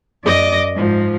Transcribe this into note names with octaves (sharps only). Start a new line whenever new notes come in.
F#2 D5 D#5 D6 A#6
G#2 F3